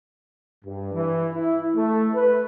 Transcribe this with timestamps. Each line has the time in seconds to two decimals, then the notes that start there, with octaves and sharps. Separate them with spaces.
0.65 G2
0.93 E3
1.34 E4
1.75 A3
2.14 B4